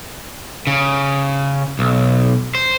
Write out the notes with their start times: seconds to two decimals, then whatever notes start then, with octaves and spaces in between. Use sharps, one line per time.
0.67 C#3
1.79 B1
2.55 C5